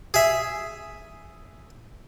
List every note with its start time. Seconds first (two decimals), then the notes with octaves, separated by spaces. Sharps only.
0.14 G#4 E5